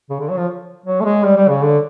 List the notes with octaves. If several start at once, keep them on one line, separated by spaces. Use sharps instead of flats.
C#3
D3
F#3
F3
F#3
A3
G#3
G3
G3
C#3
D3